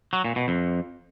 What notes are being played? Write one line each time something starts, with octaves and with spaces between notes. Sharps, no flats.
F#3
A#2
B2
F2